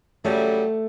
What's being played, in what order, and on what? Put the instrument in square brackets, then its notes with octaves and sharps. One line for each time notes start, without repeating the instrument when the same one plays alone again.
[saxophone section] C#3 F#3 G3 [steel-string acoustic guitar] A3